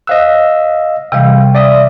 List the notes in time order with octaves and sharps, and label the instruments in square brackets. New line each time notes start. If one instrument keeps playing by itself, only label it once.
[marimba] C5 F#6 [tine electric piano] D#5 F5 E6
[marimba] C3 E3 G3 [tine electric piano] F5 G5
[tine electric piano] D5 E5 D#6